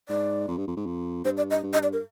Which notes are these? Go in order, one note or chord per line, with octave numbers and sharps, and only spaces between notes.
G#2 D5
F2
G2
F2
G#2
F2
G2 C5
D5
D#5
G2
D#5
D5
A#4